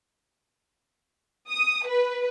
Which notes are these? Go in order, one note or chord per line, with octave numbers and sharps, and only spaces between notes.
D#6
B4